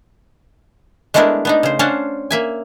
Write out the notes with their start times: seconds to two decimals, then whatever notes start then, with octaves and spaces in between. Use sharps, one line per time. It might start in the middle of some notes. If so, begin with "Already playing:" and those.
1.14 G#3 A3 B3 D4 E4 A#4
1.45 B3 D4 D#4
1.63 C#3 C5
1.79 C#4 D4 C5 F5 F#5 A5
2.31 A#3 E5 G#5